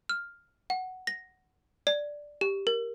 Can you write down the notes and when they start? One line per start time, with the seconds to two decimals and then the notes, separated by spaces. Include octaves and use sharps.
0.09 F6
0.70 F#5
1.07 A#6
1.87 D5
2.41 G4
2.67 A#4